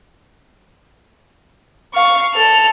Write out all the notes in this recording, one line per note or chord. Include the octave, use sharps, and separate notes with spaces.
F5 C#6
A4 F7